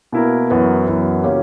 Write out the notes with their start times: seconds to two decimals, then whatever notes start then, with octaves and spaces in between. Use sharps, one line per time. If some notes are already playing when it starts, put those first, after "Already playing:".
0.12 B2 A#3 E4 A#4
0.50 F#2 E3 B3 F#4 A#4
0.87 F#2 E3 B3 F#4 A#4
1.24 C#3 F#3 A#3 C#4 G4